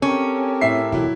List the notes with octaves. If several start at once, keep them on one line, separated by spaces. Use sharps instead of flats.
C4 C#4 G4 A4 A#4
A2 E5 C7
E1 F#3 E4